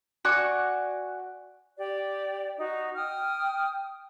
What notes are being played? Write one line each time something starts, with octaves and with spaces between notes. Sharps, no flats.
F#4 D5 G#5 C#6
G4 D5
D#4 F#4
G5 D#6 F6